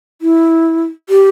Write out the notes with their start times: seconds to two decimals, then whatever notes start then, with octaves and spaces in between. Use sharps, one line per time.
0.22 E4
1.09 G4